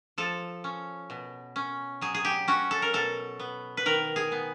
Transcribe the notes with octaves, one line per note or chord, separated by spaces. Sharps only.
F3 A4
C#4
B2
C#4
F#3 G#4
G#4
G4
C#4 F#4
A4
A#4
B2 A4
B3
B4
D#3 A#4
G#4
B3